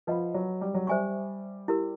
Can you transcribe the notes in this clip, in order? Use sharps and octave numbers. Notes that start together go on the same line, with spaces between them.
F3 B4 D#5 F#5 B5
F#3
G3
F#3
G3 C5 E5 G#5 C#6
E4 G4 A#4